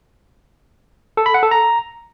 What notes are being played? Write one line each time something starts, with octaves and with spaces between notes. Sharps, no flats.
A4
B5
F#5
A4
A#5